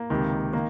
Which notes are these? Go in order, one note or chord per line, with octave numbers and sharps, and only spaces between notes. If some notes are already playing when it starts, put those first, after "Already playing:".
Already playing: A#3
C#2 C3 D#3
D#3 A#3